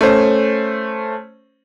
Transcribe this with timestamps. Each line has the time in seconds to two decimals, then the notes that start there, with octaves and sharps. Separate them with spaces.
0.01 A3 C#4 C5